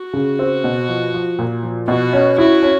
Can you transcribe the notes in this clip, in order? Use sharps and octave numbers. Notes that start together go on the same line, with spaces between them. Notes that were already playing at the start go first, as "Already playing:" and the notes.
Already playing: F#4
C#3
C4
B2
F3
F3
A#2
F3
B2 F#4
C#4
E4 F#4
C#4